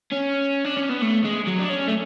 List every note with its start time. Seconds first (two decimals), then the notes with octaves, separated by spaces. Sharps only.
0.12 C#4
0.65 D4
0.77 C#4
0.89 B3
1.02 A3
1.24 G#3
1.47 F#3
1.59 D4
1.69 C#4
1.88 A3